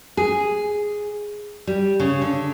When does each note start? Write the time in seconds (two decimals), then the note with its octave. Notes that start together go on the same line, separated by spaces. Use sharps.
0.17 G#4
1.67 G3
2.00 C#3
2.22 D3